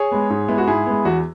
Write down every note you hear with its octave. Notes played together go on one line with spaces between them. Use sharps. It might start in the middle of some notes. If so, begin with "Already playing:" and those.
Already playing: G#4 C#5
G#3 B3
G#2
G#3 B3 E4
F#4
G#2 E4 G#4
G#3 B3
E2 F#4